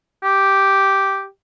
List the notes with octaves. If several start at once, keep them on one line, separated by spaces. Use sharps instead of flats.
G4